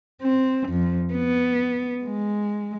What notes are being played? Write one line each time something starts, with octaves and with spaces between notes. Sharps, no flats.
C4
F2
B3
G#3